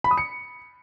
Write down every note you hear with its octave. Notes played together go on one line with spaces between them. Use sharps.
B5
D#6
C#7